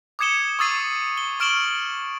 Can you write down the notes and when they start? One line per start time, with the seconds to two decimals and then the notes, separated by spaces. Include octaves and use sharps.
0.19 D6 D#6 G#6 C#7 E7 G7
0.59 C#6 D#6 E6 A6 C7 D#7
1.18 G7
1.40 C#6 F6 D7 E7 F#7 G7